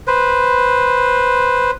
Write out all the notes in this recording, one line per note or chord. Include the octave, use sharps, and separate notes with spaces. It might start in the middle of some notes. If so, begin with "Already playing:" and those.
B4 C5